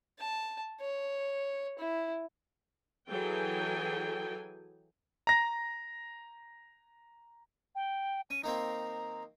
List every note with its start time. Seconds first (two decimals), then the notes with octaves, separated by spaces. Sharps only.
0.19 A5
0.81 C#5
1.79 E4
3.08 E3 F#3 G#4 A4 G5 G#5
5.27 A#5 A#6
7.75 G5
8.30 C#4 D#7
8.44 D#3 A#3 C4 A#5